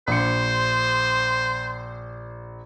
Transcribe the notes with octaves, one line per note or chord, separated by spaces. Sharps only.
A#1 C5 C#7